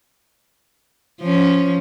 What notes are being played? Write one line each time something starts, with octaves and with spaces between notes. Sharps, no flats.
F3 C#4